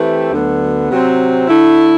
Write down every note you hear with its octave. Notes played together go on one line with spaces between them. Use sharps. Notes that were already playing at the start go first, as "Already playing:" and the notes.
Already playing: E3 A3 C4 G4 B4
D2 D3 F#3 B3
C3 F#3 C4
D3 A3 E4